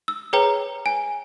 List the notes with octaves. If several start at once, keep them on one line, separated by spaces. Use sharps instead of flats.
E6
G#4 B4 C#5 G5 A#5
G#5